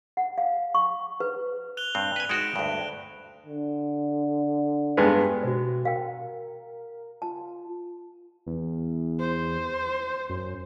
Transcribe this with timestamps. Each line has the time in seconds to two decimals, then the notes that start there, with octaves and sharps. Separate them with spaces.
0.17 F#5
0.38 F5
0.75 C#6
1.20 B4
1.77 F#6 F7 G7
1.95 G2 C4 F#6
2.16 B4 G#5
2.29 G#3 D#4 F#4 D7 E7
2.56 D2 G2
3.46 D3
4.97 G2 G#3 B3
5.43 B2 F#4 C5
5.85 A#4 F5 G5
7.22 F4 A5
8.47 E2
9.20 C5
10.30 F#2